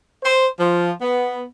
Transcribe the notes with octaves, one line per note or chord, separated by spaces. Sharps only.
C5
F3
B3